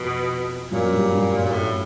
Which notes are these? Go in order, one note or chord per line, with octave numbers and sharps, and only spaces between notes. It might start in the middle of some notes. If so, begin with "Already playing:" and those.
Already playing: F2 B2 F3
F#2 A#2 F#3
G2 G3
G2 G3
F#2 F#3
A#2
A2